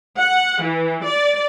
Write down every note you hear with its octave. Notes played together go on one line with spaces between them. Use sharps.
F#5
E3
D5